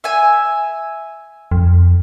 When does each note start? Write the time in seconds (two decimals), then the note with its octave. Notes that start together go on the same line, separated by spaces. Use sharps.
0.04 E5 G#5
1.51 F2